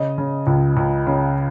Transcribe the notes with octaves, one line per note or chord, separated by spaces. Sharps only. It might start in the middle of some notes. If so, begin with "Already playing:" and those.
Already playing: C#3 D#5
C#3
C#2
C#2
C#3